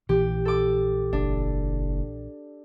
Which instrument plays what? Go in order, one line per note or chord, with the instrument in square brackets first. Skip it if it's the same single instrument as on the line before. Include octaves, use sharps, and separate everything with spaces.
[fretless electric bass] A#1 E3 [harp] G4
[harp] A4 D6
[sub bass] F#1 [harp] D4